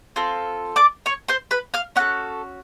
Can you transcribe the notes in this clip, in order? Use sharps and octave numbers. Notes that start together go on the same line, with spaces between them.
C4 F4 A4
D5 D6
C#5 C#6
C5 C6
B4 B5
F5 F6
C#4 F#4 A4 F#5 F#6